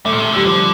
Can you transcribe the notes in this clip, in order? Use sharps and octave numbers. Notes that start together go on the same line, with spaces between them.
D3 A3
A#2
C3
D3 G3
D3 F3